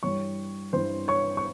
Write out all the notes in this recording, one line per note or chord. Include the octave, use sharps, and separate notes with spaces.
G2 E3 G3 C#5 C#6
G2 E3 G3 C5 C6
C#5 C#6
C#6